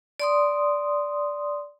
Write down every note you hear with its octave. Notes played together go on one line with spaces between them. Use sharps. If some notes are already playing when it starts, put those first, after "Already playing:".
D5 C6 D#6